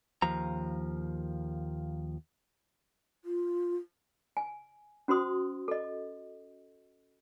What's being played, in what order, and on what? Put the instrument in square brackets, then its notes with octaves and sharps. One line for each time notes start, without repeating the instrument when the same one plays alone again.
[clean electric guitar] D#2 F3 A#5
[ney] F4
[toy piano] G#5
C#4 F#4 C5 C6 D#6
A4 D#5